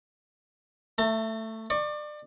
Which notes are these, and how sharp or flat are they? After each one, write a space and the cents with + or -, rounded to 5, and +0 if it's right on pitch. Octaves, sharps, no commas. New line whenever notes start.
A3 +10 A5 +45
D5 +30 C#6 +0